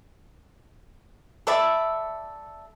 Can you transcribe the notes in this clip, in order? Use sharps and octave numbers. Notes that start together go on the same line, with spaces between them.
A4 D5 E5 B5